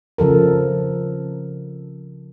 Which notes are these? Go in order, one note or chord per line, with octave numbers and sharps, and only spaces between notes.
C#3 F3 A4 A#4